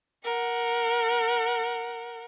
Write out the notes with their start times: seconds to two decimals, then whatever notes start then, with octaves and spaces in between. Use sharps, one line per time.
0.24 A#4 F#5